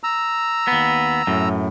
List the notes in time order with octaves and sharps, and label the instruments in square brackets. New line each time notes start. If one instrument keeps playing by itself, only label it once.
[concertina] A#5 E6
[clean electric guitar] D#2 B3
F#2 A2